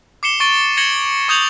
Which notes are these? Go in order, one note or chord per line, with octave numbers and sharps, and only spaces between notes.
D6 C7 C#7 E7 G7
C#6 A6 D7 G7
G#6 A#6 C#7 E7 F#7 G7
C#6 D#6 G6 G#6 F7 F#7